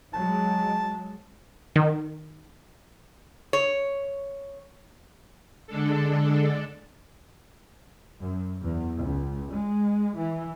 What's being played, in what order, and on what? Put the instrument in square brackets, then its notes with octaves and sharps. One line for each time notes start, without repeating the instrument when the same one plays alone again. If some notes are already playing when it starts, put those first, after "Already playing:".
[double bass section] F#3 G#3 [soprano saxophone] A5
[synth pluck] D#3
[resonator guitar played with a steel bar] C#5
[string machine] D3 G#3 D4 A4
[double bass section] F#2
E2
C#2
G#3
E3